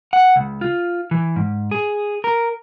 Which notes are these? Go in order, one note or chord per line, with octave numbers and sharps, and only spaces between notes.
F#5
C#2
F4
E3
G#2
G#4
A#4